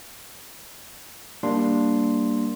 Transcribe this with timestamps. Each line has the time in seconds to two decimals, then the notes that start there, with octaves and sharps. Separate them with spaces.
1.43 G3 A#3 D4 C6